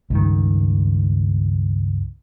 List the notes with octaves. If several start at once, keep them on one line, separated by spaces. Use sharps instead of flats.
C#2 G2 D#3